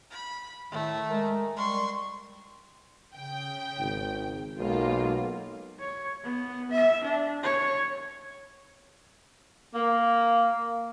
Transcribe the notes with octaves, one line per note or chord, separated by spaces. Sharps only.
B5
A2 D#3 A3
G#3 A#4
G3 C6 C#6
C#3 G5
G#1
B1 G#3 A#3 F4
C#5
B3
E5
D4
C#5
A#3